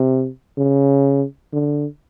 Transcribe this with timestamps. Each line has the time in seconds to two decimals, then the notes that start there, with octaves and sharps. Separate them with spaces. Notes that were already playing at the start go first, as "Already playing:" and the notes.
Already playing: C3
0.58 C#3
1.53 D3